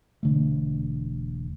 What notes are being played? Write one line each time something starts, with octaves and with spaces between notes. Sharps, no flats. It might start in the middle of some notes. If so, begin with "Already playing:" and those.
E1 D3 A3